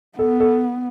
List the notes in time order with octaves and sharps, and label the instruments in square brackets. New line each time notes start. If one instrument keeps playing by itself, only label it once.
[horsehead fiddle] B3 [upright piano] A4
[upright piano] A4